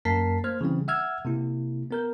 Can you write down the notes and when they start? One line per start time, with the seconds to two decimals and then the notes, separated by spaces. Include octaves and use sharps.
0.05 F#2 A#3 A#4 A5 B6 C7
0.44 A#3 C5 F6 G#6
0.61 C#3 E3 G3 C4
0.88 E5 F#5 E6 F6 G#6
1.25 C3 A#3 E4
1.91 B3 A#4 G6